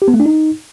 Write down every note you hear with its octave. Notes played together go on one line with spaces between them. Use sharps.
G4
B3
A3
D4
D#4